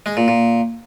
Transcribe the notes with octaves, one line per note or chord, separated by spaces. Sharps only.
G#3
A#2
A#2